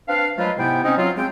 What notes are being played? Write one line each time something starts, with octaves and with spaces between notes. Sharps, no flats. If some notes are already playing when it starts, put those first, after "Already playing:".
C4 D4 B4 F5
F3 F#3 G#3 A3 F4 B4
G#2 C3 B3 E4 G5
C4 C#4 D#4
F#3 C4 F4
G#3 C4 G5